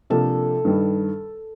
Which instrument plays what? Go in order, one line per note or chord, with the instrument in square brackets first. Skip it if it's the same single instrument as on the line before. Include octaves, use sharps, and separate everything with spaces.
[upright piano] C3 F3 A#3 D4 [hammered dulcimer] A4
[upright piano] G2 D#3 G3